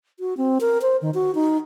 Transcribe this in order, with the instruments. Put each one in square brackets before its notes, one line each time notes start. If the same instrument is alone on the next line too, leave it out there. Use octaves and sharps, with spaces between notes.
[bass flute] F#4
C4
A#4
C5
D#3
F#4
D#4